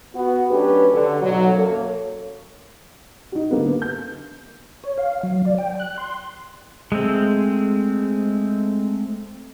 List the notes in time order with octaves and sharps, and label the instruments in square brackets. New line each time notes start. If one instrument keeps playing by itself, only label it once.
[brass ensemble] B3 F#4
F#3 A3 C#4 D4 G4 B4
D3
B1 F#3
F#2 A#3 A4 C#5
[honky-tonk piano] D#4 F#4
D3 A#3 B3
G6
[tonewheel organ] C#5
F5
F#3
D5
G5
F#6
C6
[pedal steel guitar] G#3 A3 C4